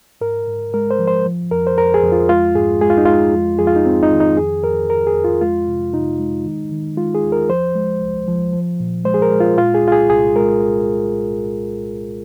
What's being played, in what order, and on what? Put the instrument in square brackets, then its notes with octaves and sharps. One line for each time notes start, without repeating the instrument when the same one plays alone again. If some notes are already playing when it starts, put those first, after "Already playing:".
[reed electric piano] G#2 A#4
G#2
G#3 A#4
C5
F3
C5
F3
F2 A#4
C5
F2 A#4
G#4
F2
F4
G#3 F4
G#2 G#4
G#3 G#4
F4
D#4
G#3 F4
F2
F2 G#4
F4
D#4
F2 C4
D#4
D#3
D#4
F2 G#4
F2 A#4
F3 A#4
G#4
F2
F4
G#3 F4
C3
C3 D#4
G#3
D#3
D#3
G#3 F4
G#4
D#2
A#4
F3 C5
G#3
C2
F3
F3
A#2
G#3 C5
G#4
A#4
G#3
F4
A#2 F4
G#4
C2 F4
G#4
C2 G#4
G#3 A#4